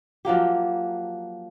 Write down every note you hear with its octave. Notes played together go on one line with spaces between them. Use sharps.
F3 F#3 A#3 G4